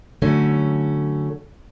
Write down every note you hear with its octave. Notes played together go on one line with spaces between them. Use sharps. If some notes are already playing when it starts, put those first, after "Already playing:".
D3 F#3 A3 C#4